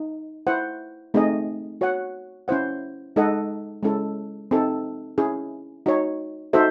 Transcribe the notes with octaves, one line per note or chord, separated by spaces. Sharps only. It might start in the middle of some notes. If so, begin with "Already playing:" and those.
Already playing: D#4
E4 C5 F#5
A3 C4 D#4 G#4 D#5
F#4 C#5 F#5
C#4 E4 C5 F#5
G#3 D#4 A4 D#5 F#5
G#3 C#4 E4 A4
C4 D#4 A4
C#4 E4 G#4
D#4 F#4 C#5
D#4 F#4 A4 C5 E5